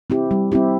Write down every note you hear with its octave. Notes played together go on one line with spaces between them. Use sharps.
C4 E4 G4
G3
C4 E4 G4